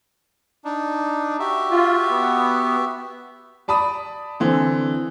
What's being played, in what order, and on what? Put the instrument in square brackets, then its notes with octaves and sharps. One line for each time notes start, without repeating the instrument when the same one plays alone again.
[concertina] D4 D#4
F#4 G4 E5
[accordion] F4
B3
[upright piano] D5 A5 B5 D#6
D3 E3 C4